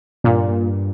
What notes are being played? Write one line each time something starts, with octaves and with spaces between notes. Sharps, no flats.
G2 A#2